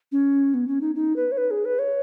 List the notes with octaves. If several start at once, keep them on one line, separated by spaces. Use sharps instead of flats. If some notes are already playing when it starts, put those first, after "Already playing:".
C#4
B3
C#4
D#4
D#4
B4
C#5
B4
G#4
B4
C#5